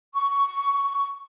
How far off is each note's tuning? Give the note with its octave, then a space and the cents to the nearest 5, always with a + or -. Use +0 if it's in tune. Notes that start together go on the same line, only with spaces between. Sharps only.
C#6 +5